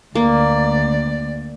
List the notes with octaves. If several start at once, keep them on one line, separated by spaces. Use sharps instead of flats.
D2 A#3 D5